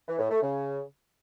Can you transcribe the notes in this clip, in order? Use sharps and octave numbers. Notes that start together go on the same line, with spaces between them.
E3
A2
A3
C#3